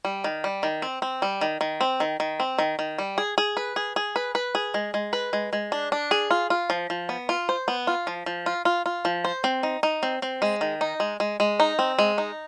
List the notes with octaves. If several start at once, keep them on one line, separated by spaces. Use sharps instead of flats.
G3
D#3
G3
D#3
C4
C4
G3
D#3
D#3
C4
D#3
D#3
C4
D#3
D#3
G3
G#4
G#4
B4
G#4
G#4
B4
B4
G#4
G#3
G#3
B4
G#3
G#3
D4
D4
G#4
F4
F4
F3
F3
B3
F4
C5
B3
F4
F3
F3
F4
F4
F4
F3
C5
C4
D#4
D#4
C4
C4
G#3
D#3
D#4
G#3
G#3
G#3
D#4
C4
G#3
D#4